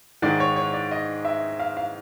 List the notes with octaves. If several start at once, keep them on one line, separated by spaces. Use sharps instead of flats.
G#2 D#3 G#3 D5
C#5
C#5
D5
D#5
E5
F5
F5